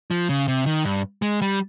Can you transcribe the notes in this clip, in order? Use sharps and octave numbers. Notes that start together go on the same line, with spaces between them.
F3
C#3
C3
D#3
G2
G#3
G3